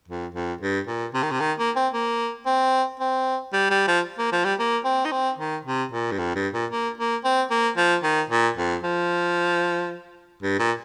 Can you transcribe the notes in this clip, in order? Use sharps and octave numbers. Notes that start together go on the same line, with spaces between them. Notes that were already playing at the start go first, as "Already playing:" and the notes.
F2
F2
G2
A#2
C3
D#3
C3
D#3
A#3
C4
A#3
C4
C4
G3
G3
F3
A#3
F3
G3
A#3
C4
D#4
C4
D#3
C3
A#2
G2
F2
G2
A#2
A#3
A#3
C4
A#3
F3
D#3
A#2
F2
F3
G2
A#2